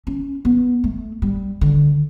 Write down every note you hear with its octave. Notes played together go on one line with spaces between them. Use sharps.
C#4
B3
A3
G3
D3